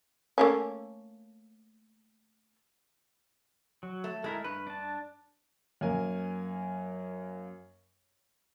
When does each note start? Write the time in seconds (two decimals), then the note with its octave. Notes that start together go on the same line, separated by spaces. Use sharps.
0.38 A3 A#3 C#4
3.83 F#3
4.04 A3
4.24 G#3 A3 E4 A#4
4.44 G2 B4
4.67 D4 A5
5.81 F#2 A#3 A#4 G#5